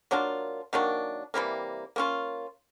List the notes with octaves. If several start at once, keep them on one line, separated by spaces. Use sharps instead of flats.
F#3 A#3 D4 F4
D#3 F#3 A#3 D4
C3 E3 G3 A#3
A#3 C#4 F4